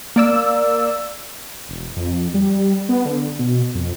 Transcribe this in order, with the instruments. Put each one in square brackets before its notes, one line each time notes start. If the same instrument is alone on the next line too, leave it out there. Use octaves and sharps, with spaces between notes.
[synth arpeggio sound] A#3 D5 E6
[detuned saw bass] E1
F2
G3
B3
D3
B2
F2